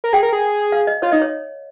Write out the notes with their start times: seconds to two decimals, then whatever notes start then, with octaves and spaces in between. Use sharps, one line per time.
0.04 A#4
0.13 G#4 G5
0.23 A#4
0.33 G#4
0.72 F5
0.87 D#5
1.02 F4 C#5
1.12 D#4 D#5
1.22 C#5